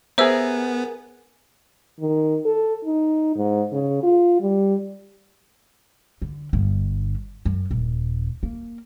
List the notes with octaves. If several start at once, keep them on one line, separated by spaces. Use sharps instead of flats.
B3 G#4 A#4 C5 E5 E6
D#3
A4
D#4
G#2
C#3
F4
G3
D3
G1 D3
F#2
D#1
A#3